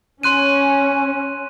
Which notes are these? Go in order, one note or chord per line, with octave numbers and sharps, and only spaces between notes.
C#4 C6 F#6 D#7